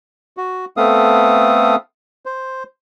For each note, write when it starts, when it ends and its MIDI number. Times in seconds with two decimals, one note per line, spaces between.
0.37 0.65 66
0.77 1.76 57
0.77 1.76 59
0.77 1.76 60
0.77 1.76 69
0.77 1.76 77
0.77 1.76 87
2.26 2.63 72